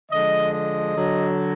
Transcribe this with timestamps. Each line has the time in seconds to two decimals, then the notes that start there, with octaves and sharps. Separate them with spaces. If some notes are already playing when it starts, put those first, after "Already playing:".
0.11 D3 F3 G#3 D#5
0.53 D#5
0.96 D3 F#3